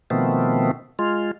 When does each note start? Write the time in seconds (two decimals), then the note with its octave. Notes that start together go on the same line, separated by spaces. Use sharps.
0.10 B2 D#3 F3 A3 B3 C4
0.99 G#3 F4